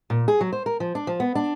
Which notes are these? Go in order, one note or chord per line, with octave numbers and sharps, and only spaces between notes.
A#2
G#4
F#3
C5
A#4
F3
D4
F3
B3
D4